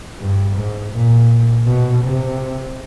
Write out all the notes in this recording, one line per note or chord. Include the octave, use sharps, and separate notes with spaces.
G2
G#2
A#2
B2
C3